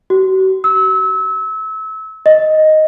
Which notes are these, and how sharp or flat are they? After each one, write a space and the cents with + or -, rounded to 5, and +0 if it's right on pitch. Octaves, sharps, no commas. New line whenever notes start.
F#4 +40
E6 -30
D#5 +0